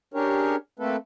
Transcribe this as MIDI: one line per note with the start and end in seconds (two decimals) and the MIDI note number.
0.14 0.56 61
0.14 0.56 62
0.14 0.56 67
0.14 0.56 68
0.14 0.56 70
0.14 0.56 73
0.79 0.96 57
0.79 0.96 58
0.79 0.96 60
0.79 0.96 69
0.79 0.96 71